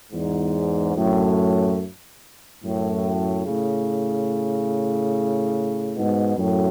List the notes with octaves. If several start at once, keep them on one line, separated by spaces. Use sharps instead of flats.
E2 G#2
F#2 A2
F#2 A2
A2 C#3
G#2 B2
F#2 A2